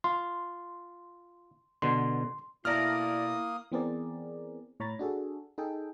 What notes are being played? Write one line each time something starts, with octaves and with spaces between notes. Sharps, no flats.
F4 C6
B2 D3 C6
B2 A#3 E4 A4 A#4 D5 D#6 F6
E3 B3 C4 G#4 A#4 D5
A2 C#5 A#5 B5 A6
D4 F#4 G#4 A4
D#4 G#4 A4 G5